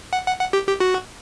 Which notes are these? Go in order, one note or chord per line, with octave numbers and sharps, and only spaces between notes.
F#5
F#5
F#5
G4
G4
F#4